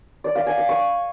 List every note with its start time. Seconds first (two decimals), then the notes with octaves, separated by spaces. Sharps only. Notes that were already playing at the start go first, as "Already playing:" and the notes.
0.24 D5
0.35 F5
0.47 G#5
0.58 D6
0.69 C#6